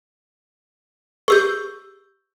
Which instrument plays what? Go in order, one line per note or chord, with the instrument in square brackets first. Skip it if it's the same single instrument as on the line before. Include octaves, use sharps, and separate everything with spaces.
[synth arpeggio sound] G4 G#4 [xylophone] C#6 E6 G6